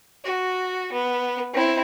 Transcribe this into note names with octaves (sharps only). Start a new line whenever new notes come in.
F#4
B3
C4 E4